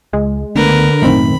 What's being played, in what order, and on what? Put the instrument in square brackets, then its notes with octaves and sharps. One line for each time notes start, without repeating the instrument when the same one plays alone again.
[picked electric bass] C#2 [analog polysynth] G#3
[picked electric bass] C#2 A3 B3 [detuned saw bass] D3 [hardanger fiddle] A#4 B4
[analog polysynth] B1 D#3 C4 [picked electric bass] F#2 A2 A3 [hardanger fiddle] B5